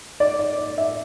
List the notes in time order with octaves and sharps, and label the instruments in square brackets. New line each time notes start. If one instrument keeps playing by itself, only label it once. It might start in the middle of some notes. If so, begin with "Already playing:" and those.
[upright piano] D5
D5
D5
E5